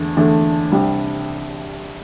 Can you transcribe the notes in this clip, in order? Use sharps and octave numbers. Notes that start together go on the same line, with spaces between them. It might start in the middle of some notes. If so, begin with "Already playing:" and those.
Already playing: E2 D3 A3 D4
E2 D3 A3 D4
C2 C3 G3 D4